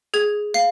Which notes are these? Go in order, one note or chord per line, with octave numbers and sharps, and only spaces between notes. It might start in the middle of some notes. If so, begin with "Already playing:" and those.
G#4 G#6
F5 C7